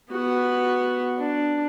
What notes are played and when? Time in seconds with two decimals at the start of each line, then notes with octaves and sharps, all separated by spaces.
0.11 B3 F#4
1.19 D4